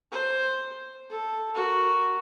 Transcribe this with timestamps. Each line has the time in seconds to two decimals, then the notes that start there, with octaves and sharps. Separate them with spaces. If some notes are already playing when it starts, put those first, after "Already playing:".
0.12 C5
1.10 A4
1.55 F#4 A#4